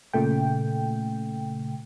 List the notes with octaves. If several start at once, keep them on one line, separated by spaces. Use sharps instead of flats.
A#2 C#3 A3 G5